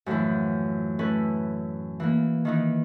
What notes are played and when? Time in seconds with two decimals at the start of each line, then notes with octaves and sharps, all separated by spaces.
0.06 F#2 A2 E3 F3 E4
0.99 A3 C#4 E4 A4 B4
2.00 E3 A#3
2.45 D#3 E3 D#4